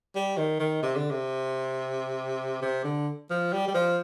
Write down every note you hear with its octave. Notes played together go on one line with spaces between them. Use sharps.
G3
D#3
D#3
C3
D3
C3
C3
D3
F3
G3
G3
F3